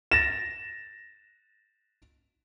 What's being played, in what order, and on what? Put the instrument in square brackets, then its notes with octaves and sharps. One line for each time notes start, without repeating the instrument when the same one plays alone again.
[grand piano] A6 A#6 E7